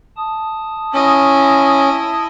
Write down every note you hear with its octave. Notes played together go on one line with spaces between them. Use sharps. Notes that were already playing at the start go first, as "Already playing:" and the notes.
A5 D#6
C#4 E4 D#5